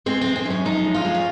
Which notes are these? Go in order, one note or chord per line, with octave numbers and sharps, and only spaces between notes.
G#3 C4
G#3 C4
C4
F#2 C#4
F3 D#4
G#3
F4
G#3
C#4